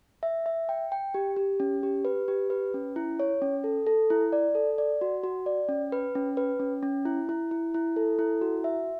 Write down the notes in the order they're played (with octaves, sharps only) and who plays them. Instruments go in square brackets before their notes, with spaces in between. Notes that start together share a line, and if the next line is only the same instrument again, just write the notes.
[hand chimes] E5
E5
G5
G5
G4
G4
C#4
G4
B4
G4
B4
C#4
E4
C#5
C#4
A4
A4
E4
D5
A4
D5
F#4
F#4
D5
C#4
B4
C#4
B4
C#4
C#4
E4
E4
E4
E4
A4
E4
F#4
E5